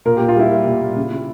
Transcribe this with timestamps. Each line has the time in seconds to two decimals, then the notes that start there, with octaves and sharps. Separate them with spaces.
0.05 A#2 A#4
0.17 G4
0.20 A#2
0.28 F4
0.36 G3 E4
0.52 G3
0.66 A#2
0.82 A#2
0.96 C#3
1.12 C#3